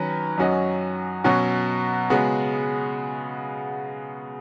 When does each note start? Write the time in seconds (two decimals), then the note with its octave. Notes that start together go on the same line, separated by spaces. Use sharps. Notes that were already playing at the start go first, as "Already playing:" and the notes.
Already playing: D#3 F#3 C#4 B4
0.38 F#2 F#3 C#4 F#4 D#5
1.24 B2 F#3 C#4 F#4
2.10 C#3 G#3 B3 F#4